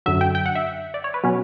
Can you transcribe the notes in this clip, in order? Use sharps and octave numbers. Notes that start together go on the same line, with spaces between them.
F#2 D3 F#3 E5
G5
G5
F#5
E5
D5
C#5
B4
B2 F#3 C#4